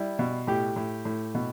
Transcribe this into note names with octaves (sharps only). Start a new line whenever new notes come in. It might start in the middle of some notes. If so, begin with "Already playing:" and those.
Already playing: G3 E4
B2
A2 G4
A2
A2
B2